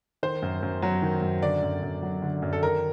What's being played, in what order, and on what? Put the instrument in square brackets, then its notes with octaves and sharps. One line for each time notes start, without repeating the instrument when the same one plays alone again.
[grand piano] D#3 C5
F#2
F#2
F#3
D#3
F#2
D3 D5
F#2
F#2
F#3
D3
F#2
A4
D#3 A#4